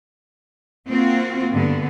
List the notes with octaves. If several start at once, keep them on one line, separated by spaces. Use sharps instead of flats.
A#3 C4 F4 F#4
G2 D3 B3